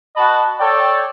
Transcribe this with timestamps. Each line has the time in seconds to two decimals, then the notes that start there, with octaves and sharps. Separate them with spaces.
0.16 F#4 B4 D#5 A5 B5
0.60 A4 C#5 D5 G5